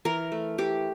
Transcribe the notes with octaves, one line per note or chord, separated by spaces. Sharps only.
E3 A#4
A3
E3 G4